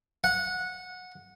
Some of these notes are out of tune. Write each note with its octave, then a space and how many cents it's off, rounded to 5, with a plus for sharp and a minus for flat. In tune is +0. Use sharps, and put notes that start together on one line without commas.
F#5 -15